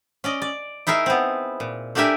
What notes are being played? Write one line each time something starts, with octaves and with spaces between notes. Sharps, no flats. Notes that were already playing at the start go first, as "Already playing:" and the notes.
C#4 D5 D#5
D5
D#4 E4 G#4 A#4 E5
B3 C4
A#2
A3 D4 G4 A#4 E5 G#5